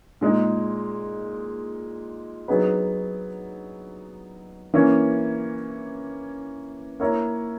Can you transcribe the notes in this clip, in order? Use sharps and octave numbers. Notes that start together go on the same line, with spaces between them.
A#2 G#3 D#4
F#3 B3 D#4 G#4 B4
E3 A#3 C#4
A#3 E4 A#4 C#5